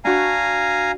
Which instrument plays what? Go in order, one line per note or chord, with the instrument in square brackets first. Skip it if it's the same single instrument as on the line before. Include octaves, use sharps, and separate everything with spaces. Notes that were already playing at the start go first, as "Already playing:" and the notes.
[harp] D4 F#4 C#6 [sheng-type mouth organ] F5 G#5 A#5